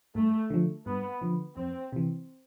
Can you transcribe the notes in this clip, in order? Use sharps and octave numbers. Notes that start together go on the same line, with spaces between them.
G2 A3
D3 F3
G2 B3
D3 F3
F2 C4
C3 E3